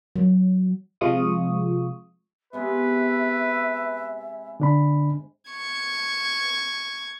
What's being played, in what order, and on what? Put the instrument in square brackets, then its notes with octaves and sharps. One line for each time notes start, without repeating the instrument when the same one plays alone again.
[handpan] F#3
[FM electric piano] C3 F3 G#3 F4 C#6 D#6
[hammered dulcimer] C3 G#3 B3 [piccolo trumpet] B4 [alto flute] E5
[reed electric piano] D3 D4 B5
[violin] C#6 G#6